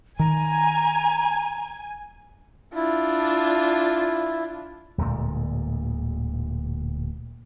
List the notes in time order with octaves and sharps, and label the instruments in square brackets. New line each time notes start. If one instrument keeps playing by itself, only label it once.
[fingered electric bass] D#3 [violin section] G#5 [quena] A#5
[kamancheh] D4 F4 [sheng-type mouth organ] E4
[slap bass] D1 D2 A#2 G#3